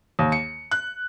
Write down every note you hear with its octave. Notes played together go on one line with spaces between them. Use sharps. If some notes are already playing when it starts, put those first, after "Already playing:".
D#2
C#7
F#6